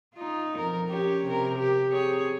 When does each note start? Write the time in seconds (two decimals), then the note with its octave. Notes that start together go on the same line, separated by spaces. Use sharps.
0.15 D#4 F4
0.56 F2 A#4
0.88 C#4 G4 C#5
1.26 C3 A#4
1.58 G4
1.91 C4 G#4 C#5